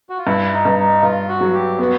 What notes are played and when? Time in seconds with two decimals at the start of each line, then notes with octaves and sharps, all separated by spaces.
0.10 F#4
0.18 F4
0.27 G2 E4
0.53 D#4
0.65 G2
0.78 D#4
1.03 G2 F4
1.28 F#4
1.41 F#3
1.54 G4
1.78 B3 F#4